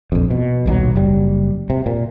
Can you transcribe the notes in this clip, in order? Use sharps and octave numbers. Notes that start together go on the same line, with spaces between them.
A#1 F2
B2
D#1 B1 A#2 F#3
F#1 G3
C3
A#2